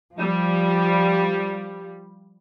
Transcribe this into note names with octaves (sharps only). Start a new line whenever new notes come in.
F3 G3